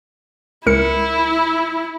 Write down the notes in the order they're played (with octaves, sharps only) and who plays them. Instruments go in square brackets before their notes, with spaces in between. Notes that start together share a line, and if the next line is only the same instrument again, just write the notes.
[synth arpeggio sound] C#2 A#4 C#7 [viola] E4